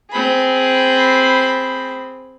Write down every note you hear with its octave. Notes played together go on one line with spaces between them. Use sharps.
C4 G#4 B5